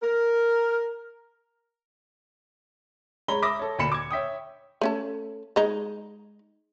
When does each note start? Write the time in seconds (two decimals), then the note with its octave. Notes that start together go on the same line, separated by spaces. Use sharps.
0.02 A#4
3.28 G#3 C#5 A#5 B5 G7
3.42 E5 B5 D6 D#6 A#6
3.59 A4 C#5
3.79 D2 A#2 B5 C#7 E7
3.92 D6 G#6
4.11 C#5 E5 G5 D#6
4.81 A3 C#4 A4
5.56 G#3 D#4